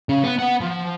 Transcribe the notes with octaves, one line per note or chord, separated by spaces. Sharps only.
C#3 C#4
B3
B3 F#5
F3